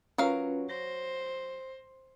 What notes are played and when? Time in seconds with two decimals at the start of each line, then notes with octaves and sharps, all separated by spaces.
0.18 F#3 C#4 F4 A#4 B4 F5
0.69 C5 A#6